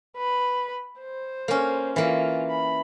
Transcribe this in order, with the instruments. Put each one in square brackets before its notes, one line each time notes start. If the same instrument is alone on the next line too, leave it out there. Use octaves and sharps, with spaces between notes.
[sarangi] B4
C5
[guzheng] A#3 C#4
[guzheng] E3 A#3 [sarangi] F4
[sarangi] B5